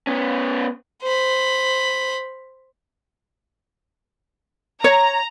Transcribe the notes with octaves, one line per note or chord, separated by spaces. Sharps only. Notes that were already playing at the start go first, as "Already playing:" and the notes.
B3 C#4
C5 B5
C#5 A#5